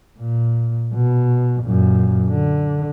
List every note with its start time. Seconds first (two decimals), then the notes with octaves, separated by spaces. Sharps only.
0.19 A#2
0.95 B2
1.63 F#2 A#2
2.28 D3